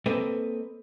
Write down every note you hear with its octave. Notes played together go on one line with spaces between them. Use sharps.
A#3 C4 A4 B4 D#5